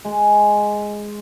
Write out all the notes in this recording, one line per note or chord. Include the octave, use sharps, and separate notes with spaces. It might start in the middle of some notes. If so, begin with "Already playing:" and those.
G#3